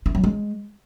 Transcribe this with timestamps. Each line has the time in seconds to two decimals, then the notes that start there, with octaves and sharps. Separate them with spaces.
0.06 E4
0.15 F#3
0.24 G#3